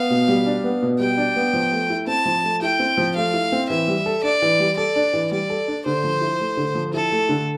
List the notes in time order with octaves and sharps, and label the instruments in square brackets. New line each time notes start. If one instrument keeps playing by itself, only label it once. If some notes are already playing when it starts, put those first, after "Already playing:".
Already playing: [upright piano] B3 [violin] F5
[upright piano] B2
G3
D4
B3
B2
[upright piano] G3 [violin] G5
[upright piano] D4
B3
F3
A3
E4
[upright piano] C4 [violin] A5
[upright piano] F3
A3
[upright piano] E4 [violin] G5
[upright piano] C4
F3
[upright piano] A3 [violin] F5
[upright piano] E4
C4
[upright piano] E3 [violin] E5
[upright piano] G3
A4
[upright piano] D4 [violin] D5
[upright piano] E3
G3
[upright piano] A4 [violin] D5
[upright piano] D4
E3
[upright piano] G3 [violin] D5
[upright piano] A4
D4
[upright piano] D3 [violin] C5
[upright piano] F3
E4
A3
D3
F3
[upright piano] E4 [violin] A4
[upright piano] A3
D3